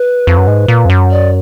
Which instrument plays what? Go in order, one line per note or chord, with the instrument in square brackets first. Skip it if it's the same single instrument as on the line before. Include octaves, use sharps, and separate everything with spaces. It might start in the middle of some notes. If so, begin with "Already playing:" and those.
Already playing: [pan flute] B4
[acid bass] F2
F#2
G#2
A#2
F2
F#2
[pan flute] D5